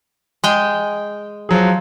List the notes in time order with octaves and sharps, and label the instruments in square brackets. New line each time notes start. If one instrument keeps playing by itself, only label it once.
[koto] G#3 G5
[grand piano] F3 F#3 G#4